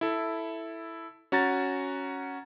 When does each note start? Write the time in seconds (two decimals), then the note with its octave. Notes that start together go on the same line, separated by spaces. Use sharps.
0.01 E4 A4
1.32 C#4 F#4 A#5 A6